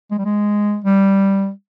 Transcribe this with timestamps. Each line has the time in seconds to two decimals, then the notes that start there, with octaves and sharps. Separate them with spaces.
0.11 G#3
0.18 G3
0.25 G#3
0.84 G3